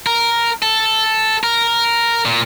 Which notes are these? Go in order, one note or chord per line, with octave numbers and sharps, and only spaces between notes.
A#4
A4
A#4
A#2